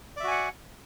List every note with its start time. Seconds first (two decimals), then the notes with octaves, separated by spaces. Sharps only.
0.17 D5
0.20 E5
0.24 F#4
0.28 G#5
0.31 F#5